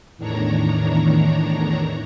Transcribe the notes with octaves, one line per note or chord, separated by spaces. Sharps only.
E2 A2 D#3 D4 C#5 A#5